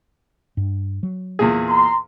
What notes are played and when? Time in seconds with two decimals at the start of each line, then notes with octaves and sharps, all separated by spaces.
0.57 G2
1.03 F#3
1.39 E2 A#2 G#4
1.69 A#5 C6